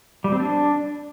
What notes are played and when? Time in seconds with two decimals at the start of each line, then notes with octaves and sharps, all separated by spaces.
0.24 G3
0.32 C4
0.40 D4